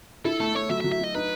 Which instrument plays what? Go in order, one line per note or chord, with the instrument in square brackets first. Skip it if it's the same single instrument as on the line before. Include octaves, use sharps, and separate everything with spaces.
[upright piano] E4 [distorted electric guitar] A4
[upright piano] A3 [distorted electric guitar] A4
[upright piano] A3 [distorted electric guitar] C#5
[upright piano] F#3 [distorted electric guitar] E5
[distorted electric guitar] E5
[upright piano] F#3
[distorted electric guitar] E5
[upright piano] F#3 [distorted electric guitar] D#5
[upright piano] D#4 [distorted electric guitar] B4